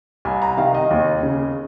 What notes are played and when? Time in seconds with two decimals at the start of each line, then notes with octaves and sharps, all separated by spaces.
0.25 C2 G#5
0.42 A#5
0.57 C3 D#3 F5
0.75 D#5
0.91 D#2
1.23 C#3